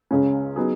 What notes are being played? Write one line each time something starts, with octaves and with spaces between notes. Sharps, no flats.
C#2 C#3 G#3 C#4
F#3 B3 D#4 G#4